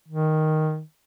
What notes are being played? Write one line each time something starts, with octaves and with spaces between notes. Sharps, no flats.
D#3